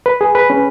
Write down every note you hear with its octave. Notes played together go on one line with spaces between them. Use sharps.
B4
G#4
B4
C#4